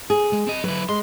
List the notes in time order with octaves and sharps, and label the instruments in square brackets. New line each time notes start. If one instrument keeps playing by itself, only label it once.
[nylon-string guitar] G#4
[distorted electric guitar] G#3
C4 D#5
[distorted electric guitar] F#3 E4 [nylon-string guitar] B4
[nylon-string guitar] G#3 [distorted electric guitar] C6